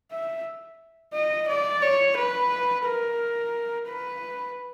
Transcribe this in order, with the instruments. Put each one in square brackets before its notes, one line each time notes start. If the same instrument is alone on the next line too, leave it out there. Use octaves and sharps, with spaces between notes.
[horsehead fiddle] E5
D#5
D5
C#5
B4
A#4
B4